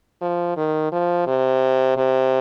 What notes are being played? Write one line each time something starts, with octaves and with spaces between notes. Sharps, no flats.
F3
D#3
F3
C3
C3